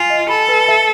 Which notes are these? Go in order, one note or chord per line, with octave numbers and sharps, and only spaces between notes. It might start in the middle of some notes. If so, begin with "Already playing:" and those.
Already playing: F4 G#5
D#5
A4 B5
B4
E5